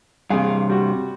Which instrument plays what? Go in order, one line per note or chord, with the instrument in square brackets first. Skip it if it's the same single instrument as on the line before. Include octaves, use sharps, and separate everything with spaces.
[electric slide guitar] G2 C3 [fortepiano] G#4 F5
[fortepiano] G3 F#4